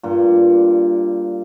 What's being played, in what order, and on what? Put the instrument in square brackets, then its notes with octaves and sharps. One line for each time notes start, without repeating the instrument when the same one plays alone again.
[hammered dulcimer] G2 A#2